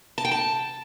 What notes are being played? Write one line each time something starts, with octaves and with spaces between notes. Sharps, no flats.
A5
G5
A5